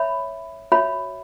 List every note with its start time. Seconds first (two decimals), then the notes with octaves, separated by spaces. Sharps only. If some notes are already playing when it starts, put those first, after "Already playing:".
Already playing: C#5 E5 B5
0.72 F#4 C#5 E5 B5